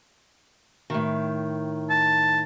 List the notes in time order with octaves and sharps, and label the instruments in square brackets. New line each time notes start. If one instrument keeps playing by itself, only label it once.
[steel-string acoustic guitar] A2 D#3
[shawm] A5